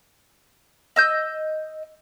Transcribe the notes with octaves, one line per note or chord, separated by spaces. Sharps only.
D#5 E6 G6